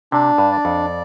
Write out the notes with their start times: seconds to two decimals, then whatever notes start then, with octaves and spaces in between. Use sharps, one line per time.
0.12 C3 D4
0.38 G2
0.52 D5
0.65 F2